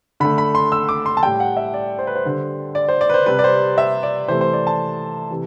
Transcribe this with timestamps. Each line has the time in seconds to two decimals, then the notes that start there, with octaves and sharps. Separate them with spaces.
0.20 D3 A3 B5
0.38 B5
0.55 C6
0.72 E6
0.89 D6
1.06 C6
1.17 A5
1.23 A2 G3 G5
1.40 F#5
1.57 E5
1.74 D5
1.99 C5
2.07 B4
2.16 C5
2.25 D3 G3
2.75 D5
2.89 C5
3.01 D5
3.10 B4
3.14 C5
3.26 C3 G3 B4
3.39 D5
3.44 C5
3.78 E5
4.03 D5
4.28 C3 E3 A3 C5
4.41 C5
4.53 D5
4.67 A5
5.31 C3 E3